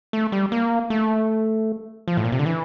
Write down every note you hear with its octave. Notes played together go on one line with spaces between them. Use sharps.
A3
G3
A#3
A3
F3
A2
A#2
C3
D3
E3